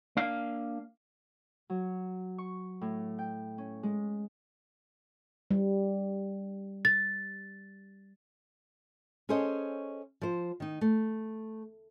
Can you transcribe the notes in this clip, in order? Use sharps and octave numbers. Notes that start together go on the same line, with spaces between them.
A#3 D4 F5
F#3
C#6
A2
G5
C#4
G#3
G3
A6
C#4 G#4 A4 C5 C#5 D#5
F3 C5
D#3 D#4
A3